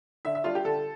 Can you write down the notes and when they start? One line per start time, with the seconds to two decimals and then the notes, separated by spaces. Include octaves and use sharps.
0.25 D3 E5
0.35 E5
0.44 G3 D4 F4
0.55 G4
0.65 D3 A4